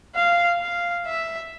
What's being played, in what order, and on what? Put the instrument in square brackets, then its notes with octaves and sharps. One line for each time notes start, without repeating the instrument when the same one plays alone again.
[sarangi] F5
F5
E5